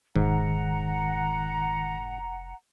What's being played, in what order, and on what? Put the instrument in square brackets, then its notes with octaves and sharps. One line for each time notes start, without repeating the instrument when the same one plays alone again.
[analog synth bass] F1 [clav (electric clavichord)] G#2 [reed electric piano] D#3 [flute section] F#5 A#5